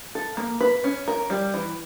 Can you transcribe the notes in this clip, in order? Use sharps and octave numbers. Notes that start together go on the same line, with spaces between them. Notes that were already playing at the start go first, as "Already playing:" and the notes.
A4
A#3
B4
C#4
A#4
G3
E3